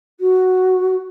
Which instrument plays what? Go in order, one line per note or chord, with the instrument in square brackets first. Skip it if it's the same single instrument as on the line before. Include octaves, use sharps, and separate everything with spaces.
[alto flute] F#4